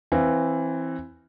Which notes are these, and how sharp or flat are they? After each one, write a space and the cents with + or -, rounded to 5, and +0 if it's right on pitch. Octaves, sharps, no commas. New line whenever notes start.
E3 +0 C4 +15 F5 +0